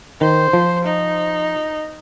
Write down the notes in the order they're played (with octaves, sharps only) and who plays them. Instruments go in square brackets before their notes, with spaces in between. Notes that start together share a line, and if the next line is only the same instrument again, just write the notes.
[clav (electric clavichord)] D#3 [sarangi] C5
[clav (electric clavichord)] F3
[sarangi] D#4